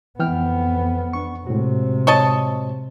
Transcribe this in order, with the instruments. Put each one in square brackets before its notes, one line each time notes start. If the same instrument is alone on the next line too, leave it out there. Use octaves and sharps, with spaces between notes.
[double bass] F2 B3 [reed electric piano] E3 G5 F6
[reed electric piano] D4 C#6
[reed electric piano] A2 G#3 F#4 [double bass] C3
[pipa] C#5 D#5 A5